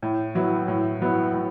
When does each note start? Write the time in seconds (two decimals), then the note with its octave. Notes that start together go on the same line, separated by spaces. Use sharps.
0.03 A2
0.35 F#3 B3 E4
0.68 A2
1.01 F#3 B3 E4
1.34 A2